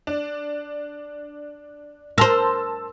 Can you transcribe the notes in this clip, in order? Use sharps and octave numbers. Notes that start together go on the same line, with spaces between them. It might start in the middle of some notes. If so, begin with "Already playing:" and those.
D4
A#4 C5 A5 C6 E6